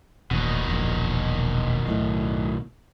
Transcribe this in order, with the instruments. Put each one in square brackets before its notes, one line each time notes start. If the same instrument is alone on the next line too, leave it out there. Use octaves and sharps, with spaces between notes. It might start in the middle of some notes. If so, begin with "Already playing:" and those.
[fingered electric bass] D#1 A1 [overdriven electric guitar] B2 D#3
[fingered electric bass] E1 A#1
B1 A2